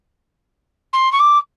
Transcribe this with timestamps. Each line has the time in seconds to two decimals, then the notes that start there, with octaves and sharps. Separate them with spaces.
0.93 C6
1.12 C#6
1.19 D6